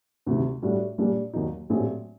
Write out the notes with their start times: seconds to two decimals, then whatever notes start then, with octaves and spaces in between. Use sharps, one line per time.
0.26 D2 C3 D#3
0.62 A2 G3 D4 F#4
0.98 A#1 A#2 G3 A#3 D4
1.33 D#2 D#3 F#3 A#3 D#4
1.70 A#1 A2 F#3 C4 G4